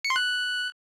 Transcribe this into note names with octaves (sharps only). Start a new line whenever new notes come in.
C#7
C6
F#6